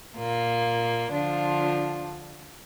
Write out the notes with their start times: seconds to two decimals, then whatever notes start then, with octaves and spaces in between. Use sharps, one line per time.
0.16 A#2 A#3 F4
1.12 D3 F3 D4 F4